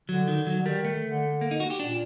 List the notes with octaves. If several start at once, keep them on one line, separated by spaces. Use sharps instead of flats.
D3 F#3
D#3
F#3
D3
D#3 G3
A3
D3
A#3
D#4
F#4
G4
A#2 D4